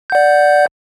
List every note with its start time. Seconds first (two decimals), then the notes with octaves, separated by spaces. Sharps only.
0.10 G6
0.12 F#5
0.15 D5